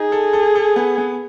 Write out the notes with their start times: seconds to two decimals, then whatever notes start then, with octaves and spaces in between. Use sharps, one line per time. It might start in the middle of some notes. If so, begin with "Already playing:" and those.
Already playing: D#4 G#4
0.12 A4
0.33 A4
0.55 A4
0.76 B3
0.98 B3